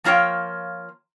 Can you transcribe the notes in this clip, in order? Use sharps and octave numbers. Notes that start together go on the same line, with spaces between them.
F3 A#3 F4 C#5 G5